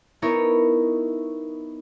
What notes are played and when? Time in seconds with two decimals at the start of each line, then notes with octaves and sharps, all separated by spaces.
0.22 B3 D#4 E4 A#4 C#5